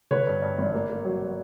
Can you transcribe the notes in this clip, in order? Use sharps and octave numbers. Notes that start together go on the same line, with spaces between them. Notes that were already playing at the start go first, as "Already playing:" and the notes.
D3 B4 C#5
G2
G2
G#1
A#3
A#3
F#3
F#3